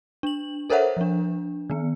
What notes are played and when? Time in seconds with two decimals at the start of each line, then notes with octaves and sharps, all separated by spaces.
0.23 D4 F#7
0.70 A4 A#4 C5 C#5 E5 F#5
0.97 F3 D4
1.70 D#3 B3